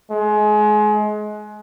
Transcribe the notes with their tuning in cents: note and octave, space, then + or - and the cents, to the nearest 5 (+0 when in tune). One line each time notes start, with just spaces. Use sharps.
G#3 +25